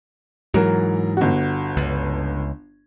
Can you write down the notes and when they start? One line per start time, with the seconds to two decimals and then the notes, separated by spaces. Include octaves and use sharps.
0.54 G#2 E3 F#3 A#4
1.17 G1 F#4
1.77 C#2